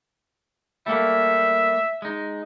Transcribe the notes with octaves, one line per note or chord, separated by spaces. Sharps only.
G3 A3 A#3 E5
G#3 D#4